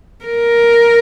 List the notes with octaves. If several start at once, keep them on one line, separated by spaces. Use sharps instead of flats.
A#4